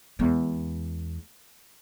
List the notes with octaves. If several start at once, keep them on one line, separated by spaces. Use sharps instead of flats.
E2 G#3